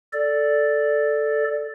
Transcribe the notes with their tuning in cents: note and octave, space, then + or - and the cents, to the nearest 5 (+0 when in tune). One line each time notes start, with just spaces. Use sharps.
A4 +0 D5 +0